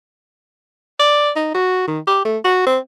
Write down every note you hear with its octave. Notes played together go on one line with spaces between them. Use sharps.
D5
D#4
F#4
D#3
G4
A3
F#4
C4